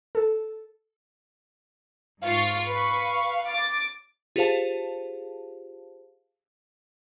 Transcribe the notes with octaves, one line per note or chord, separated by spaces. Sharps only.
A4
G#2 F4 F5 C#6
B4 C#6
D6 A6
F4 G4 G#4 C5 F5 A5